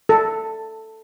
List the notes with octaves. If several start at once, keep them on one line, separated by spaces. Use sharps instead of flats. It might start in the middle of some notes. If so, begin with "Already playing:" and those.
A4